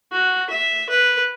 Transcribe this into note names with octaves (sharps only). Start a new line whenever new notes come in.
F#4
E5
B4